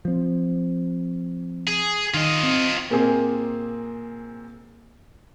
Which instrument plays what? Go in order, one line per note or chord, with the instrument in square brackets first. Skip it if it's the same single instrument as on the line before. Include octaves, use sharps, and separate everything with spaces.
[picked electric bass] F3 C4
[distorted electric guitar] G#4
[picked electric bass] D#3 [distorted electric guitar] F4 D#5
[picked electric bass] C4
[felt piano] A#2 A#3 C4 G#4